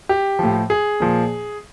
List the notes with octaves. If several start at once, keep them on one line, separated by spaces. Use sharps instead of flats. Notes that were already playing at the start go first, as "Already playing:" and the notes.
G4
A2 F3
G#4
A#2 F3